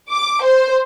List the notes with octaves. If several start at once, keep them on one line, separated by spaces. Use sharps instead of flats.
D6
C5